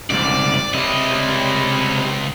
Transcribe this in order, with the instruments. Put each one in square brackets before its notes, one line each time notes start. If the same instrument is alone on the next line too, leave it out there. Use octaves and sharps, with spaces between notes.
[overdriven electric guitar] C2 G#2 [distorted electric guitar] D5
[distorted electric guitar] C#2 D#5 [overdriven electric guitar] C3 E4